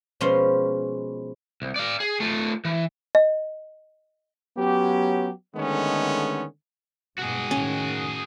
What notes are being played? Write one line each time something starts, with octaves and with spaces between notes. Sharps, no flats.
B2 F3 G#3 C#4 C5 C6
C2
D5 F5
G#4
A3 F4
E3
D#5
F#3 B3 C#4 G4
D3 D#3 G#3 A3 B3 C#4
G2 B2 G#3 F#4 G#4
A2 D#3 C#4